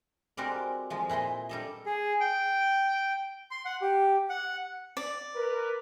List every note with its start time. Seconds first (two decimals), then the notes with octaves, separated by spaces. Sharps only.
0.37 G3 G#3 C4 F#4 A#4 D5
0.90 F3 G#3
1.09 A#2 E4 D#5 C6
1.49 G3 A4 D#5
1.86 G#4
2.20 G5
3.51 C6
3.65 F#5
3.81 G4
4.29 F#5
4.97 D5
5.35 A#4 B4